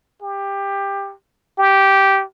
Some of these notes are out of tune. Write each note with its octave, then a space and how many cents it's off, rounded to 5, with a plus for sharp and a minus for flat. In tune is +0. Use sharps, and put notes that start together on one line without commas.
G4 +15
G4 -10